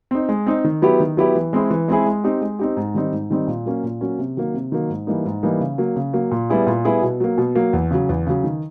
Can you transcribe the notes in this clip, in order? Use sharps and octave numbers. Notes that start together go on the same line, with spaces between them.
C4 D#4
G#3
C4 D#4
D#3
F#3 B3 E4 G4
D#3
F#3 B3 E4 G4
E3
G#3 C4 E4 G#4
E3
G#3 C4 E4 G#4
G#3
C4 D#4 G4
G#3
C4 D#4 G4
G#2
D#3 G3 C4 D#4
G#2
D#3 G3 C4 D#4
A#2
F#3 A#3 C#4
A#2
F#3 A#3 C#4
C3
D#3 F#3 A#3
C3
D#3 F#3 A#3
G#2
E3 G3 A#3 D#4
G#2
E3 G3 A#3 D#4
C#3
F#3 A#3
C#3
F#3 A#3
A#2
G3 B3 E4 G#4
A#2
G3 B3 E4 G#4
B2
F#3 A#3
B2
F#3 A#3
E2
C#3 F#3
E2
C#3 F#3
D#3